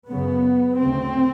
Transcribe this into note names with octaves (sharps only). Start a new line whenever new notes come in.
F#2 C#3 B3
D2 C#3 C4